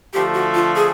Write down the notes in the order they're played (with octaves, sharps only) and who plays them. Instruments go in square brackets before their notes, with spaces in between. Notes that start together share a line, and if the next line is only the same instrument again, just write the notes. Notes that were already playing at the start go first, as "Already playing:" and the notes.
[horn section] D3 F3 A3 [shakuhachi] G4
[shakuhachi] F#4
F4
G#4